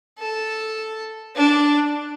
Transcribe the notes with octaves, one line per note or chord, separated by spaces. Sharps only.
A4
D4